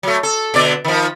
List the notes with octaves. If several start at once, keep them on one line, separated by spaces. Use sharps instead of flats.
F#3 A3
A4
B2 D3 D5
D#3 F3